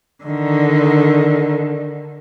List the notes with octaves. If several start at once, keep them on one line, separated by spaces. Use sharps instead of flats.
D3 D#3